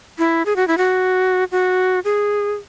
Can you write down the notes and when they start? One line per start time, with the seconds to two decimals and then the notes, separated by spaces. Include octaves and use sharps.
0.19 E4
0.46 G#4
0.56 F#4
0.68 E4
0.78 F#4
1.52 F#4
2.05 G#4